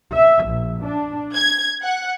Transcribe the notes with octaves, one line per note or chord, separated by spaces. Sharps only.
E5
A#1
D4
G#6
F#5